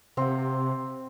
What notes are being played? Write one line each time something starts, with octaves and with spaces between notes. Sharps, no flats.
C3 C4 F#5